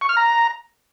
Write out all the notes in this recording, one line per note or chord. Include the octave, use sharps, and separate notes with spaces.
C#6
F6
A#5